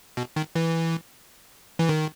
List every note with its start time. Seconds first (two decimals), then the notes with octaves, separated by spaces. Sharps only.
0.17 B2
0.36 D#3
0.55 E3
1.79 E3
1.89 D#3